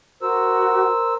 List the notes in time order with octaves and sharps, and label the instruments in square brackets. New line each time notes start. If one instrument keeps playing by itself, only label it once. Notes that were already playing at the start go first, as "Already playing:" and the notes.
[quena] F#4 [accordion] A#4 C5 E6